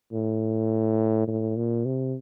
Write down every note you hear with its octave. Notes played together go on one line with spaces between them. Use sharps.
A2
A2
A#2
C3